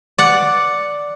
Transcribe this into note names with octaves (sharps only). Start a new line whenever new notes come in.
D5 F#5